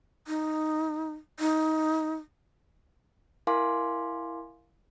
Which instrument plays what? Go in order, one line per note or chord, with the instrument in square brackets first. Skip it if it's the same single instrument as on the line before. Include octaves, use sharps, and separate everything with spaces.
[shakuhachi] D#4
D#4
[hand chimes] E4 A#4 F5 G#5 C6 D6